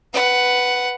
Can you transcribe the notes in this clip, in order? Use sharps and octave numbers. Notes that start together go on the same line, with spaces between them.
B4 F#5